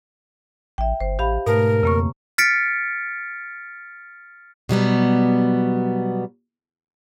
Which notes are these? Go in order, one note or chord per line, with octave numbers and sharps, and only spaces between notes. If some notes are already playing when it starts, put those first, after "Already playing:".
A1 E5 G5
G1 C5
A1 G4 F5 B5
G#2 B2 A3 A#4
F2 C#3 A#3 C#6
F6 A6 B6 C#7 D7
B2 F#3 G3 B3